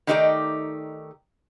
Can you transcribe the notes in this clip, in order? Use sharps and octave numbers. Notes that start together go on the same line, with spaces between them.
D#3 A3 D#4 G4 A4 D5